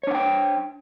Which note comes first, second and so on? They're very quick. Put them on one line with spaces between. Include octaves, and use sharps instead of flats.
C#5 D4 F#5 G5